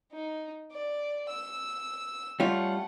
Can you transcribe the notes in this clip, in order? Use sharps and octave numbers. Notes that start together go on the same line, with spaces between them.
D#4
D5
E6
G3 A3 C#4 F4 F#5